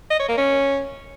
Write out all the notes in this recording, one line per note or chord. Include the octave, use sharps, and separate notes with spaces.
D#5
C#5
A#3
C#4